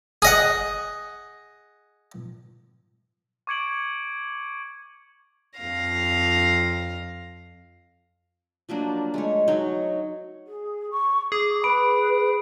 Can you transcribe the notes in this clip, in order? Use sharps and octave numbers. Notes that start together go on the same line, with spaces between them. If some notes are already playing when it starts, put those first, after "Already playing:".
G#4 D#5 F#5
C#6 D6 G#6 C#7 D7 F#7
F2 F5 A#6
F3 F#3 A#3 D4
G#3 A3 C#5
F#3 D#4 C#5
G#4
C#6
G#4 D6
B4 B5 D7